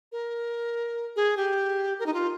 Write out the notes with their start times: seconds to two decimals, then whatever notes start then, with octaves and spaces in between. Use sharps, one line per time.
0.12 A#4
1.16 G#4
1.37 G4
1.99 A#4
2.06 D#4
2.14 F4